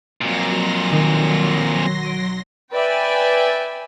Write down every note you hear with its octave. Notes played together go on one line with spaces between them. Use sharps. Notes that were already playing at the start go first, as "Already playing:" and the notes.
F2 A#2 F#3 C6 A#6
B1 D#3
D7 D#7
B4 D5 E5 G5 G#5